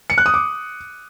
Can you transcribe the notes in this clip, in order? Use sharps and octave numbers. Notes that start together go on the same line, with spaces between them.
C#7
F#6
D#6
D6